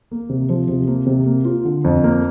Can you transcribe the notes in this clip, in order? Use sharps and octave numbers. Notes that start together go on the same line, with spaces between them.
A#3
C3
F3
C3
A#3
C3
A#3
F4
D3
F2
A#3